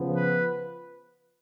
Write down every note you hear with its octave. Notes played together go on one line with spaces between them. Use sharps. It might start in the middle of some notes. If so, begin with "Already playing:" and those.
Already playing: C#3 F3 B3
B4